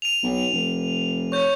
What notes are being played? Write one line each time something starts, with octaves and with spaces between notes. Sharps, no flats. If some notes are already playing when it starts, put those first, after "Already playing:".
D#7 F7
B1
F1
C#5 C#6 G6